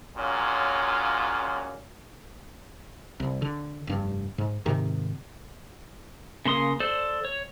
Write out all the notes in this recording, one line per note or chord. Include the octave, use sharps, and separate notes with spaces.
A#2 F#3 G#3 C#4 F4
C2
D3
F1 G2
G#2
G#2 C3 D#3
C#3 A#3 C6 D#6
A4 C5 D5
C#5